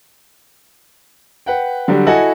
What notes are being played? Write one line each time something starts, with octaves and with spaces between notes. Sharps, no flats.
B4 F#5 G5
D3 F#3 G3
E4 F#4 A4 D#5 F#5 G#5